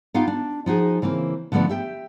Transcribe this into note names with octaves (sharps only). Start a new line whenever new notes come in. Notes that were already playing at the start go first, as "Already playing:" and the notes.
B3 D#4 F4 G4 F5 G5
D4
F3 D#4 F#4 G#4
C#3 E3 A#3 C4
D3 F3 A3 B3 D4
G4 E5 G5